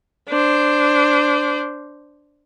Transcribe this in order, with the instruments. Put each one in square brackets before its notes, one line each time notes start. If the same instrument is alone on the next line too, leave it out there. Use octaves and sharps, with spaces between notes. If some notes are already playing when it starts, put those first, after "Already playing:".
[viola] D4 C5